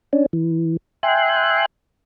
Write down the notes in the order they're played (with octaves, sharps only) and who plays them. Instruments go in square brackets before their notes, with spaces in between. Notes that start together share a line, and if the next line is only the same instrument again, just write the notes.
[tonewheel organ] C#4 D4
E3
E5 G5 G#5 C6 F#6